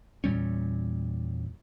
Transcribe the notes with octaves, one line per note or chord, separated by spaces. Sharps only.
E2 A#2 G3 C#4